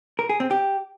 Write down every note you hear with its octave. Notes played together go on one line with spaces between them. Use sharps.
A#4
G#4
C4
G4